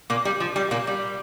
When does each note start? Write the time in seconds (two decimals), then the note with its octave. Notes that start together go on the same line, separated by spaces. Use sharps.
0.10 A#2 A#3
0.25 G3
0.40 F3
0.56 G3
0.71 A#2 A#3
0.87 G3